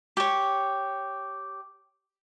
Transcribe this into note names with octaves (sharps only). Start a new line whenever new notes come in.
G4 C#5